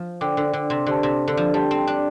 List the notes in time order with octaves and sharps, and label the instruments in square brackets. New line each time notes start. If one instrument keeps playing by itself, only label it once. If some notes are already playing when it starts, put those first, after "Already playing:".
Already playing: [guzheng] F3
[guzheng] D3 [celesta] C5 G5 D6
[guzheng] D3
D3
C3
[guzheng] D3 [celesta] G4 C5 A5
[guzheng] C3
D3
F3
[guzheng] G3 [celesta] G4 D5 A5 C6
[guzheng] C4
D4